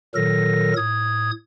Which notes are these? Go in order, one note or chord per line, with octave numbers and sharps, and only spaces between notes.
A#2 D#3 F#3 A4 A#4 A#6
A2 D#6 G#6